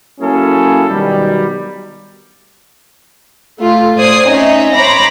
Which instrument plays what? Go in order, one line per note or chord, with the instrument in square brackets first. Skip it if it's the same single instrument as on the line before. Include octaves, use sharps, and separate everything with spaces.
[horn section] F#3 A#3 C#4 E4 G#4 A4
B2 D#3 F#3 G3
[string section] A3 F4
A2 C5 D5 D#6 G#6 C7
C4 C#4 D#4 C#5 D#5 E5
C5 C#5 A#5 B5 D6 A#6